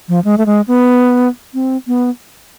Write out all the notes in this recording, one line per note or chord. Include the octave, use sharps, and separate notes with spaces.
F3
G#3
A3
G#3
B3
C4
B3